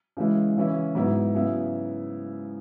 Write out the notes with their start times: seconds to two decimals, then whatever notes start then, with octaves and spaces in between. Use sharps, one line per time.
0.17 C#3 E3 G#3 E4
0.56 C#3 E3 C#4 E4
0.95 G#2 F#3 B3 E4
1.35 C#3 F#3 B3 E4